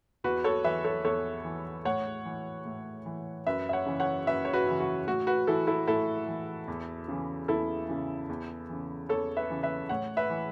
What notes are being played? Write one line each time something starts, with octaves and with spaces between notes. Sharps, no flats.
E2 F#4 B4
A4 C#5
E3 B4 E5
A4 C#5
E2 A4 C#5
E3
A2 C#5 F#5
E3
A2
E3
F#2 B4 E5
E5
C#5 F#5
C#3 E3
C#5 F#5
F#2 B4 E5
C#5
F#4 B4
C#3 E3
F#4
A2 F#4
F#4 B4
E3 E4 A4
E4 A4
A2 E4 A4
E3
E2
C#3 E3
E2 E4 A4
C#3 E3
E2
C#3 E3
E2 A4 C#5
B4 E5
C#3 E3
B4 E5
A2 C#5 F#5
B4 E5
E3